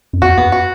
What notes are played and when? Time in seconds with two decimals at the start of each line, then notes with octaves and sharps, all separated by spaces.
0.13 F#2
0.22 F2 F#4
0.37 E2 B3
0.45 F#2
0.52 F#4